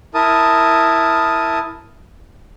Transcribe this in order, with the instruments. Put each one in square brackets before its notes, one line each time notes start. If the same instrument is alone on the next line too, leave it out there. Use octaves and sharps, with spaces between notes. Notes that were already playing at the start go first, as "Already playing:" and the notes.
[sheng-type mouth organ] E4 A#4 A5 D#6